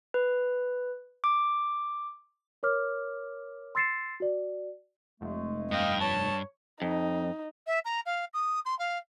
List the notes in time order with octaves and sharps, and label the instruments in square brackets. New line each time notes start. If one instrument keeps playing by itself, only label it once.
[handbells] B4
D6
[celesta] A#4 C#5 D6 F6
C6 E6 A6 C7 C#7 E7
F#4 D5
[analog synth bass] F1 [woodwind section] G#3 A3
[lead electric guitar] G2 [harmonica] D#5 F5 G5
[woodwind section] C#5 C#6 [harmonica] A5
[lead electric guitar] F2 [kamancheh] D#4
[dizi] E5
A#5
F5
D#6
C6
F5